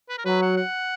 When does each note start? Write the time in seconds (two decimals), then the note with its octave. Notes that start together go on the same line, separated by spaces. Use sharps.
0.09 B4
0.18 A#4
0.25 F#3 B4
0.42 F#5
0.57 F#5